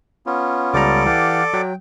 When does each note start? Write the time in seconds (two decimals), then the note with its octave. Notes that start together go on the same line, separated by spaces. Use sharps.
0.26 B3 C#4 F4
0.74 C#2 G3 A4 D5 A#5 D6
1.06 E3 G4 F5 F#5
1.54 F#3 G5